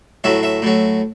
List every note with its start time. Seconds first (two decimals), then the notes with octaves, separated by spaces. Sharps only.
0.24 A2 F#3 E5
0.43 E5
0.62 A2 F#3